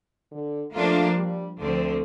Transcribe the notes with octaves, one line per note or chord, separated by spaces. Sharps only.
D3
F3 A3 A#3 D4 F4
G3
D2 D3 F3 A3 C4